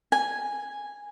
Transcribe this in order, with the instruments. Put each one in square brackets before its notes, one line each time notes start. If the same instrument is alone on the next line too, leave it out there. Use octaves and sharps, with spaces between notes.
[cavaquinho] G#5